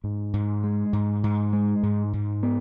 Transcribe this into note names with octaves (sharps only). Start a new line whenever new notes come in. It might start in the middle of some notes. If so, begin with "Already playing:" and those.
G#2
G#2
G#3
G#2
G#2
G#3
G#2
G#2
B3